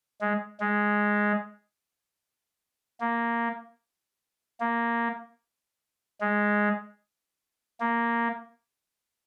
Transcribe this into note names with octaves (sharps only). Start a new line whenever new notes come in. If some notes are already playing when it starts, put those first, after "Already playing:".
G#3
G#3
A#3
A#3
G#3
A#3